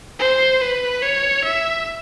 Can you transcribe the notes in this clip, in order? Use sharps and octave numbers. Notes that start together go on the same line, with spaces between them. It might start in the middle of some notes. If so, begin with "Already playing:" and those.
C5
B4
C#5
E5